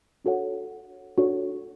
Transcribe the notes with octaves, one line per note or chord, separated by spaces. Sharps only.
D4 F#4 A4 C#5 F#5
D4 F#4 A4 C#5 F#5